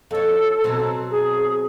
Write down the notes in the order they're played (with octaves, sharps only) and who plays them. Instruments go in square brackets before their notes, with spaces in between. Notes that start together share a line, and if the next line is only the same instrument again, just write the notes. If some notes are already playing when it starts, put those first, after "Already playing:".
[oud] F2 C#5 [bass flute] A4
[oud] B2 F#3 C4
[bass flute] G#4